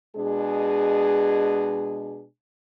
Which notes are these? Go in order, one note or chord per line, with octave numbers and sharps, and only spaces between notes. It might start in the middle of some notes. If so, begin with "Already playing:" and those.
B2 G#3 D4 G#4